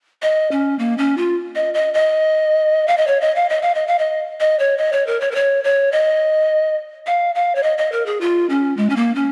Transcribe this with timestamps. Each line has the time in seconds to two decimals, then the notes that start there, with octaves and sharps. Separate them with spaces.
0.22 D#5
0.51 C#4
0.79 A#3
0.98 C#4
1.18 F4
1.56 D#5
1.74 D#5
1.94 D#5
2.88 F5
2.97 D#5
3.07 C#5
3.21 D#5
3.36 F5
3.50 D#5
3.62 F5
3.75 D#5
3.87 F5
3.99 D#5
4.40 D#5
4.59 C#5
4.78 D#5
4.93 C#5
5.07 A#4
5.21 C#5
5.31 A#4
5.35 C#5
5.64 C#5
5.92 D#5
7.07 F5
7.35 F5
7.55 C#5
7.63 D#5
7.78 D#5
7.92 A#4
8.06 G#4
8.21 F4
8.50 C#4
8.77 G#3
8.90 C#4
8.96 A#3
9.16 C#4